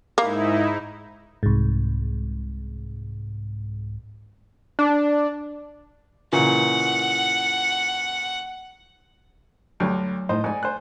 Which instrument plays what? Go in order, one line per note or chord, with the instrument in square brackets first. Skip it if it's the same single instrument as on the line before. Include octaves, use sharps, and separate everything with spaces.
[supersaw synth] G#2 D#4 E4 [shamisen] A#3
[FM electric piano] C2 G#2
[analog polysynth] D4
[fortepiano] A#2 C#3 E3 [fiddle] F#5
[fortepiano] D2 G2 [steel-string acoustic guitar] F#3
[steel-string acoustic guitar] A2 [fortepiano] D#4 C5
[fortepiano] G#2 [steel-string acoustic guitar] D5 G#5
[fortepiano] C5 F#6